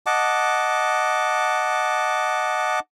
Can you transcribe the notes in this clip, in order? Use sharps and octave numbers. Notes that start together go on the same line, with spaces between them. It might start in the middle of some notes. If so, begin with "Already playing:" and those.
D#5 F#5 A5 D6